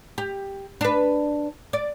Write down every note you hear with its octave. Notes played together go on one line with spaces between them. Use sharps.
G4
D4 B4
D5